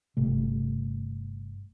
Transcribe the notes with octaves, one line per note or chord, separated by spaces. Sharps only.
G1 C3 A3